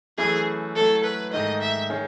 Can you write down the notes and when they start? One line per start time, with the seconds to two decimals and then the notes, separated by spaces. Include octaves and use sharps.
0.18 F#2 E3 A3 E4 G#4 B4
0.75 F#3 A3 E4 A4
1.04 B4
1.32 G#2 D#3 A3 D#5
1.61 E5
1.90 D#3 G#3 C#4 G#4